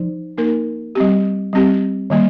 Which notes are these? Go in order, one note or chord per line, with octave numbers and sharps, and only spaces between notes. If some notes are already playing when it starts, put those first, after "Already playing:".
Already playing: F3 D#4 C5
A#3 D#4 A#4
G3 C4 G4
G3 C4 G4
D#3 G3 A#3